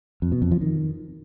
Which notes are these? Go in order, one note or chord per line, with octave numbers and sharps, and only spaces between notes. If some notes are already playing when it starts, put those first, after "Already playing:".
F2
B2
F2
F3
D#3